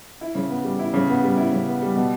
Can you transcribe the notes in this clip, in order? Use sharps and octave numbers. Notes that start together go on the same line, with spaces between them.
E4
C#3
B3
G3
E4
C#3
B3
G3
E4
C#3
B3
G3
B2